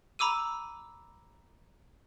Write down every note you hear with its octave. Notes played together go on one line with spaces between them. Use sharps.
A#5 B5 D6 E6 D#7